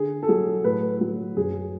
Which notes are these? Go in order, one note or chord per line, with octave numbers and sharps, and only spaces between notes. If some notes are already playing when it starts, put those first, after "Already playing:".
Already playing: D3 G#4
A4
F#3 G#4
A2 B4
F#3
F#2 G#4